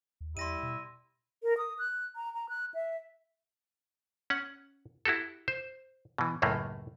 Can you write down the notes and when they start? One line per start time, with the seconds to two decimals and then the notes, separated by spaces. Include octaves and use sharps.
0.21 D#2
0.37 E2 G3 E4 C6 A#6 D#7
0.63 B2
1.43 A#4
1.58 D#6
1.79 F#6
2.16 A#5
2.34 A#5
2.49 F#6
2.74 E5
4.30 C#4 F#5
5.05 E4 F#4 G4 A4
5.48 C5
6.18 B2 E3
6.42 C#2 F#2 A2 A3 A#3